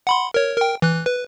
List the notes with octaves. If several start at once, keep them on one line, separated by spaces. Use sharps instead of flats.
F#5 B5 C6
A#4 C#5
A#4 G5
E3 F#6
B4